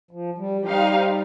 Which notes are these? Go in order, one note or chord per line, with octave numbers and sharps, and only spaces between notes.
F3
G3
F3
G3 D#4 G4 C5 F5